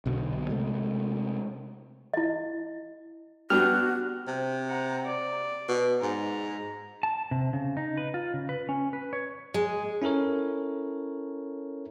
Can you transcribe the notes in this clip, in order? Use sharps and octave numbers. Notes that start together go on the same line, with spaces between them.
B1 B2 D3
C3 G#3 A3
E4 D#5
G3 B3 D4 F#4 F6
C3
F#5 A#5
D5
B2
G#2 A#5
A5
C3
C#3
D#4
B4
F4
C#3
B4
C#4
B4
C#5
G#3
C#4 E4 A4 A#4 C#5